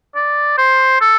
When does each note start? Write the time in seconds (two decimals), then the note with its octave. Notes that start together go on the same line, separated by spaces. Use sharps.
0.16 D5
0.58 C5
1.01 A4